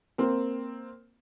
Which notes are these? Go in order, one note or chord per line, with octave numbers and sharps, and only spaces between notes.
A#3 C4